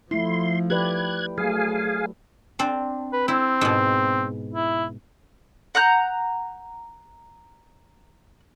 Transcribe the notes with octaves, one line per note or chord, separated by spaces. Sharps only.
F3 A3 E4 C6
G4 B4 D5 F#6 G#6
F#3 A3 G#4 F5 G#5
C4 D4
B4
C4 E4
G#2 B2
E4
F#5 A#5 F#6 G6